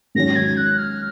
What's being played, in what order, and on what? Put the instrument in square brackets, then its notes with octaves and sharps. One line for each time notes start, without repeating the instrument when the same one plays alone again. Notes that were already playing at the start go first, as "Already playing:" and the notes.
[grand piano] G#2 D#3 F#3 C#4 [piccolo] A#6
[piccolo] G#6
F#6
F6